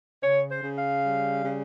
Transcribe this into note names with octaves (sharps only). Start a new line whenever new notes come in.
C#3 C#5
C5
C#3
F5
G3
C#3